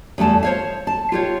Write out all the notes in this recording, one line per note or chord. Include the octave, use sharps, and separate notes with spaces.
E2 G3 A3 A5
C5 C#5 F5
A5
F4 G4 C#5